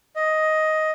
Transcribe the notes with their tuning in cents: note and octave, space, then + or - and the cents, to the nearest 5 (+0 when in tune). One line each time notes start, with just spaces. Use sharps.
D#5 +10